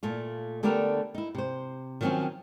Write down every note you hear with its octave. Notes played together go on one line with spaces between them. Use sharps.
A#2 A3 F4
D3 A3 B3 D4 G4 A#4
D#4 E4
C3 C5
D#3 F3 F#3 A#3 C4 C#4